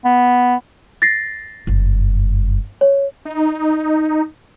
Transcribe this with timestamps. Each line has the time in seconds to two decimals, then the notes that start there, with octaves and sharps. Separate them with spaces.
0.05 B3
1.02 A6 A#6 C7
1.67 F#1 G2
2.81 C#5
3.25 D#4